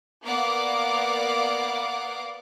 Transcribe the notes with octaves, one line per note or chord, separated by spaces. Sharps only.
A#3 B3 D5 F5 F#5 D6